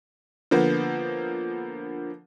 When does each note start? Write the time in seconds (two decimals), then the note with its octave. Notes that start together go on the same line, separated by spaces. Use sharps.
0.51 D3 F3 A#3 B3